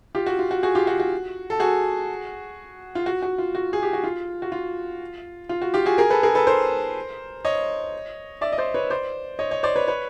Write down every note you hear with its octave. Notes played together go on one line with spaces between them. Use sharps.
F4 G4
F#4
F4
F#4
F#4 G#4
F4 G4
F#4
F#4
A4
F#4 G#4
F4
F#4
F#4
F4
F#4
G#4
G4
F#4
F4
F#4
F4
F4
F#4
F4 G4
F#4 G#4
G#4 A#4
A4 B4
G#4 A#4
A4 B4
A#4 C5
C#5 D#5
D5 E5
D#5
C5 D5
B4 C#5
C5 D5
C#5 D#5
C#5 D#5
C5 D5
B4 C#5
B4 C#5